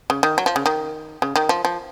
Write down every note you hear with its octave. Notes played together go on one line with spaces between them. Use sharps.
C#3
D#3
F#3
F3
C#3
D#3
C#3
D#3
F3
F3